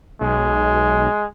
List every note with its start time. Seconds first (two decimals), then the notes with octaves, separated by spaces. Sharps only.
0.21 B1 G#3